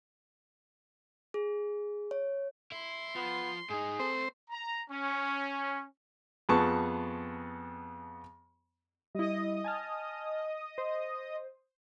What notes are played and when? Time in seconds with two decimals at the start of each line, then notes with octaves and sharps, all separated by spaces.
1.34 G#4
2.11 C#5
2.72 E4 C6
3.15 F3 B3
3.70 G#2 D#4 G#4
4.00 A3 C4 A4 C5
4.50 A#5
4.90 C#4
6.49 F2 B3 G#4 A5 C#6
9.15 G3 E4 D#5 D#6
9.64 G#5 A5 F6
10.78 C5